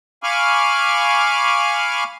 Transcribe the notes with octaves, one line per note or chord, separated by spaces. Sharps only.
F5 G#5 B5 C#6 D6 F6